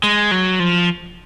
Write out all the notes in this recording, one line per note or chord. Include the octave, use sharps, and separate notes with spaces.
G#3
F#3
F3